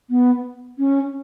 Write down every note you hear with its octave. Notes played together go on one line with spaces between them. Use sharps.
B3
C#4